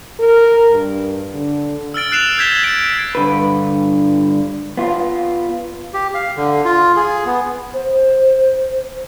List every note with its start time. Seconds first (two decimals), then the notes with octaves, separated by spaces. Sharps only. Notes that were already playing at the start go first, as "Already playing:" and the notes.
0.19 A#4
0.71 G2
1.34 D3
1.94 E6 F6 A6 D7
2.12 F#6 C7 D7 E7 F7
2.38 E6 G6 G#6 B6 E7 G7
2.63 G6 A6 D7 E7
3.15 G2 D3 B4
4.77 B3 F4
5.94 G4
6.15 F5
6.37 D3
6.65 F4
6.96 G#4
7.26 B3
7.74 C5